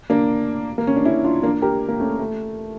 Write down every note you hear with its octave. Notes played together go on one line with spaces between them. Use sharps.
A#3 D4
A#3
C#4
D4
C#4 E4
D4 F4
A#3 D4
G4 A#4
A#3
A3 C#4
A3